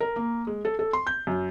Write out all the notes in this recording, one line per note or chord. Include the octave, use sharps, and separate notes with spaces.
A#4
A#3
G#3
A4
A4
C6
G6
F#2